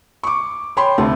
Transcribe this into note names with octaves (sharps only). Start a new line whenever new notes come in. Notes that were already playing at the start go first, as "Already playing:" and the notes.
C#6 D6
C#5 G5 B5 C6
D2 C3 A3